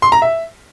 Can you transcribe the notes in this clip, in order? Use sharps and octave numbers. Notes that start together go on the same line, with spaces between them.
C6
A#5
E5